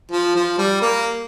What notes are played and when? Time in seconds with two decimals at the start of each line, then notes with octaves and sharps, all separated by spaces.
0.11 F3
0.35 F3
0.58 G3
0.81 A#3